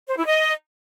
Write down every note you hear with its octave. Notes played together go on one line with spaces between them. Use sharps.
C5
E4
D#5